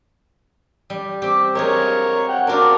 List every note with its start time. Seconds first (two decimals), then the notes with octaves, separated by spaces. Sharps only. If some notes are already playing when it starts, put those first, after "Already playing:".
0.90 G3
1.22 C4 G4
1.55 G#3 F4 G#4 A#4 C#5
2.29 F#5 G5
2.47 D4 F4 F#4 A#4 D5